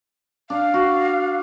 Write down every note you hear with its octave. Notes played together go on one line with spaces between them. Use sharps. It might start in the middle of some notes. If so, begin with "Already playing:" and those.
D4 F5
F#4